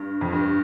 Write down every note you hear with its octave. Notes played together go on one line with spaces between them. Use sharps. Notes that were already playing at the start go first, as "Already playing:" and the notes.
Already playing: G2
F2
G2